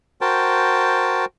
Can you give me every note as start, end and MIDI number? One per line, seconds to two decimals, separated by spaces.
0.21 1.25 66
0.21 1.25 70
0.21 1.25 72
0.21 1.25 79
0.21 1.25 81